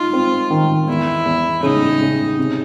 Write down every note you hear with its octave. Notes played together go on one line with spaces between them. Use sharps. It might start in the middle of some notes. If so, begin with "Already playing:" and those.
Already playing: D#4 F4
C4
D#3
E2 E4
E2
C#3 D#4
C#3
C3